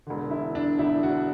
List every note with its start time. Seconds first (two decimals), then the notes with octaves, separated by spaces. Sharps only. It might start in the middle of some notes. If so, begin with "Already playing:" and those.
0.07 E1 E2 D3
0.31 E4
0.55 D4
0.79 E1 E2 D3 E4
1.03 F#4